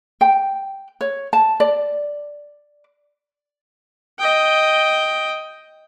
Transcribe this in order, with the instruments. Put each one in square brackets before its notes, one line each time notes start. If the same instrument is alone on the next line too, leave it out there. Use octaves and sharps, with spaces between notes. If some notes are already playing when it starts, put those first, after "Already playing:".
[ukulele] G5
C#5
A5
D5
[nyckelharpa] D#5 G5